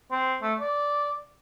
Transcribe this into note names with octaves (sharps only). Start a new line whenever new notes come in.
C4
A3
D5